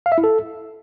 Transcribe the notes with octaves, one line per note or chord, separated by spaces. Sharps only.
F5
E5
E4
A4